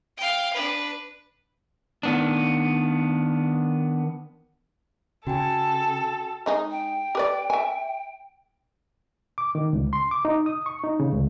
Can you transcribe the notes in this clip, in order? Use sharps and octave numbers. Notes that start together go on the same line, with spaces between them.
F5 G5
D4 B4
D#3 B3 D4
C#3 F#4 A4 G5 G#5
G#3 D#4 G#4
G5
G4 B4 D5
E5 G#5
D6
D#3
C#2
C6
D6
D#4
D#6
C#6
D#4
C#3
C#2